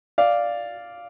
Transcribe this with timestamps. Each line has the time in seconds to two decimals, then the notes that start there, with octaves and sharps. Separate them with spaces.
0.18 D5 F5